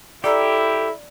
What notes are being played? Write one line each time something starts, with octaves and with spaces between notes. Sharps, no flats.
E4 G4 A4 D5 A#5 E6